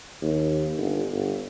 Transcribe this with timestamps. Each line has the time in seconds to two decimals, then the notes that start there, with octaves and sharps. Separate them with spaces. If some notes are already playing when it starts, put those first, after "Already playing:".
0.22 D#2
0.77 G1
1.12 G1